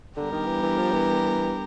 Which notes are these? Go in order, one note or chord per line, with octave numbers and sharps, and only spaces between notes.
D3 G3 B3 D4 G4 A#4
D#3
E3
E3
F3
E3